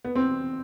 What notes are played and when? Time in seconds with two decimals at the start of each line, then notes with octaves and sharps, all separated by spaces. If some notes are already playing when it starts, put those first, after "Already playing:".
0.05 B3
0.16 C4